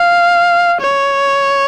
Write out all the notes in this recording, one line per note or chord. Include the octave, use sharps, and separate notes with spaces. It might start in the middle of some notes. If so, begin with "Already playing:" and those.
Already playing: F5
C#5